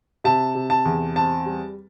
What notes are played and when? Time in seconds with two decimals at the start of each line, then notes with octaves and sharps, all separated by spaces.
0.24 C3 A5
0.55 C3
0.70 A5
0.85 E2
1.16 C4 A5
1.46 G3